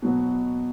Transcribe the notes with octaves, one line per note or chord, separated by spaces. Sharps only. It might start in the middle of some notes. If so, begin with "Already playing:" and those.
B2 F#3 B3